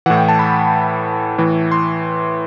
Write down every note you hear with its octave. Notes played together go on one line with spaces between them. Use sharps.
A2 E3 F#5
G5
A5
B5
A2 E3
C6